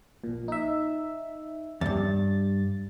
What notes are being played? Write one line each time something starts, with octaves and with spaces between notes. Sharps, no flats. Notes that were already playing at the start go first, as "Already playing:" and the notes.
A#1 A#2
D#4 E5
E2 G2 A6